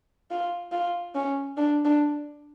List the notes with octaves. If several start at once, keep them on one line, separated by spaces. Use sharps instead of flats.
F4
F4
C#4
D4
D4